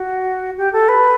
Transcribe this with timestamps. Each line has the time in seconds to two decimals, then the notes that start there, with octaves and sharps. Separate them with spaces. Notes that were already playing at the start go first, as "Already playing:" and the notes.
Already playing: F#4
0.57 G4
0.73 A4
0.88 B4